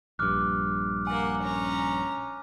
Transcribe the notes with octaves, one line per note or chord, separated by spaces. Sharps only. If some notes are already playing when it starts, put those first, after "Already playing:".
A#1 G2 D6 F6 F#6
A#3 F#5 G#5
C#4 A#5